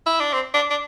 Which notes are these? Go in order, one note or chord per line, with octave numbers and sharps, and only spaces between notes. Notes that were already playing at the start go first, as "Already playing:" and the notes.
E4
D4
C4
D4
D4